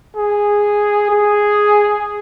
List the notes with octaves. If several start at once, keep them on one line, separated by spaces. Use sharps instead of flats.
G#4
G#4